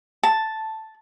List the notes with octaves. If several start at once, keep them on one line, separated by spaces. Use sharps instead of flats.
A5